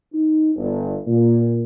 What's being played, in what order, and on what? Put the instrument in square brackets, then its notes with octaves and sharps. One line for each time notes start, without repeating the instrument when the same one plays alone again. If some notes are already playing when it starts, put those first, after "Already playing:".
[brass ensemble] D#4
G1
A#2